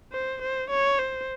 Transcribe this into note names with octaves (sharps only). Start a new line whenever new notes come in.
C5
C5
C#5
C5